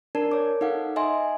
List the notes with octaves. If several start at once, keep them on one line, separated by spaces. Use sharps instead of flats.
D4 A#4 D5 A5
A#4 C#5 D6
D#4 A4 F5 F#5
D#5 E5 G#5 C6